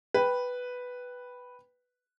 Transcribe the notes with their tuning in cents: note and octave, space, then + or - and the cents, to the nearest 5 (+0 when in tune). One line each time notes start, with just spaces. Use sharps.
B4 +0 G5 +0